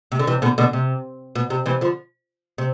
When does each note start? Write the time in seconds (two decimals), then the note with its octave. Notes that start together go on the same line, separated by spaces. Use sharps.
0.12 C3
0.19 D3
0.27 C3 E3
0.42 B2 D3
0.58 B2 D3
0.73 C3
1.35 B2
1.50 C3
1.66 C3 E3
1.81 D3 F3
2.58 C3